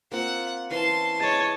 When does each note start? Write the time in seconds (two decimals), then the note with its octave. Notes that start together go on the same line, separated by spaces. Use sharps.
0.12 A#3 C4 F4 F#5
0.71 E3 C4 C#4 A5 C6
1.20 G#4 C#5 D#5 A5 D6